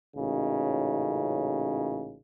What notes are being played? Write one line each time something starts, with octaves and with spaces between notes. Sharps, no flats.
A1 A#2 C#3 D#4 F#4